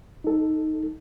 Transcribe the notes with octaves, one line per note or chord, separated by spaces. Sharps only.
D#4 A4